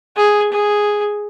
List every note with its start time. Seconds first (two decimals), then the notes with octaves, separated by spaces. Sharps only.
0.16 G#4
0.52 G#4